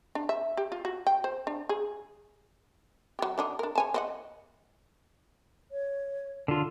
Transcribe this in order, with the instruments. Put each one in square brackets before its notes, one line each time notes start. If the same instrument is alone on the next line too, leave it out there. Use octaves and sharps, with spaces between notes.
[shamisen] D4
E5
G4
F4
F#4
G5
C5
D4
G#4
F#3 G4
D3 D4 D#4
D4 A#4
C#5 G#5 A5
C4 D#5 F#5
[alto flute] C#5
[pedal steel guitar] D3 F4